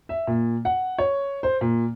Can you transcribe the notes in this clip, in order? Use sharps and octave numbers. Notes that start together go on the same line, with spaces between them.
E5
A#2
F#5
C#5
C5
A#2